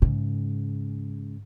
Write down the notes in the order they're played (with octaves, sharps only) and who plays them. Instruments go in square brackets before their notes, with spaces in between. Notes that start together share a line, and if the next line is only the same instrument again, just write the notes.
[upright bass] G#2 C#3